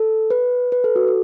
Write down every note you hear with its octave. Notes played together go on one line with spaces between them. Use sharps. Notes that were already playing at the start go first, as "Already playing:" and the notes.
Already playing: A4
B4
B4
A4
F#4
A4